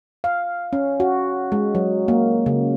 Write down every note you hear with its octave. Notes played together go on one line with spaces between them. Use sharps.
F5
C#4
F#4
G#3
F#3
A#3
C#3